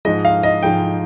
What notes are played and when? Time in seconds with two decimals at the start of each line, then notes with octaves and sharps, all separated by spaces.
0.05 G#2 F3 G#3 D#5
0.25 F5
0.43 D#5
0.63 G#2 F3 G#3 G5